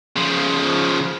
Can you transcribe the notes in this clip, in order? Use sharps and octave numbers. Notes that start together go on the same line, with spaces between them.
C#3 F3